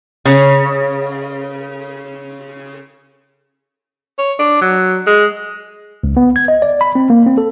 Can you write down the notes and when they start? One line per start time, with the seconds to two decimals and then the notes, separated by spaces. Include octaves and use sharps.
0.25 C#3 C#4 C#5
4.18 C#5
4.39 D4
4.61 F#3
5.07 G#3
6.04 C#2
6.17 B3
6.36 G#6
6.48 D#5
6.62 D5
6.81 B5
6.95 C4
7.10 A#3
7.26 C4
7.38 A4